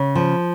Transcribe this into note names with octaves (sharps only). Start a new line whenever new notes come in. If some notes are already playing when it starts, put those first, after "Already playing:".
Already playing: C#3
F3